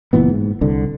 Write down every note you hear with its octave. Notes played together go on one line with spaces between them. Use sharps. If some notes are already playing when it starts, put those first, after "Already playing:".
F#1 A#2 E3 B3
G#2
C2 D3